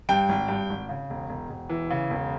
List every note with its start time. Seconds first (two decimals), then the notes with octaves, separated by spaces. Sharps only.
0.09 G2 G5
0.29 G#1
0.48 G2
0.69 G#1
0.89 C#3
1.10 E1
1.29 E1
1.50 E1
1.69 E3
1.90 C#3
2.10 E1